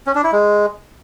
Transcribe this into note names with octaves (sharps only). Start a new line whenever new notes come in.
C#4
D4
E4
G#3